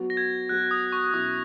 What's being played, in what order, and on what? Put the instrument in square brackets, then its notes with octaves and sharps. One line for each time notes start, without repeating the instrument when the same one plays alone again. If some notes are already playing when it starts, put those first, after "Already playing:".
Already playing: [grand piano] F#3 B3 F#4
[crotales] A#6
G#6
[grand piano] F#3 B3 F#4 [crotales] F#6
[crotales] D#6
C#6
[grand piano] B2 F#3 C#4 E4 [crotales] D#6